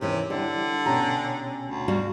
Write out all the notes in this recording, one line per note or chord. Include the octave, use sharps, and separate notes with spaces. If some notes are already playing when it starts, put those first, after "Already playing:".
D#2 C3 E3 C#4
D3 G3 D4 E4 G4
B2 C#4 G4 C#5 G5 A#5
D2
G3 F#4 F5